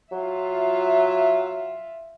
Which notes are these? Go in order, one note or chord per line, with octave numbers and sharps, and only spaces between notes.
F#3 F4 E5